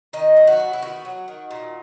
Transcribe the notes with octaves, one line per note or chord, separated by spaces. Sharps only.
D#3 D#5
F#3
F#4
B3
E4
D#3 F#4
F#3
D#3
A#2